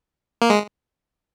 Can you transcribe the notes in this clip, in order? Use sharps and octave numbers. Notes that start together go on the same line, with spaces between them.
A#3
G#3